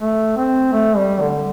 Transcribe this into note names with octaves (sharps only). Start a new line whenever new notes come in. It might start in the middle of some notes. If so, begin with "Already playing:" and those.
A3
C4
A3
G3
D3